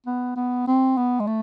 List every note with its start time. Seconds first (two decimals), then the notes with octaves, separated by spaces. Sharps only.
0.06 B3
0.36 B3
0.67 C4
0.97 B3
1.20 G#3
1.27 A3